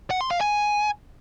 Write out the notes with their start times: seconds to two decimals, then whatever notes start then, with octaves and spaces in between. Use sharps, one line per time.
0.11 F#5
0.21 C6
0.31 F5
0.41 G#5